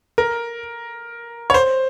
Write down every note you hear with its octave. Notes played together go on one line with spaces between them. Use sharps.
A#4
C#5
C5